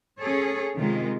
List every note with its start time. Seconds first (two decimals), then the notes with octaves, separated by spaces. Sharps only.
0.19 C#4 G#4 A4 C#5
0.76 C3 D#3 G#3 F4